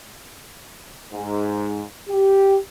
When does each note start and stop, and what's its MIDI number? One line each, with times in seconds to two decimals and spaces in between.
1.13 1.84 44
2.09 2.57 67